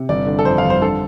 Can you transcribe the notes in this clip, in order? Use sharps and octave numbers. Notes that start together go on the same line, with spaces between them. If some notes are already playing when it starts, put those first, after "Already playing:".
Already playing: C3
G1 D5
D3
A4
F2 C5
F5
G1
C5
D3 A4